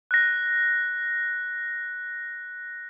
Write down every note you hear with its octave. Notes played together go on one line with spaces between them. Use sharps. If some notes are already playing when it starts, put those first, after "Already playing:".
F#6 A#6